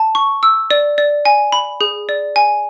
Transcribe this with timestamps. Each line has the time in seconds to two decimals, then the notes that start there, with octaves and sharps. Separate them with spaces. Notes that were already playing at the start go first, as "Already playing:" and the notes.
Already playing: A5
0.15 C#6
0.43 E6
0.71 D5
0.98 D5
1.25 G#5
1.52 B5
1.81 G#4
2.09 D5
2.36 G#5